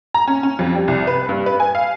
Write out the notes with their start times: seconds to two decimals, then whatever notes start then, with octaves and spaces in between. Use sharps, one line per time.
0.14 A#5
0.27 C#4
0.43 C#4
0.59 F2
0.75 G3
0.88 C2
1.07 B4
1.29 G2
1.46 B4
1.60 G#5
1.75 F5